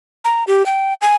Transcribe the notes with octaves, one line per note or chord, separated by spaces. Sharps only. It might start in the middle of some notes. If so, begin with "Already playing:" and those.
A#5
G4
G5
G#5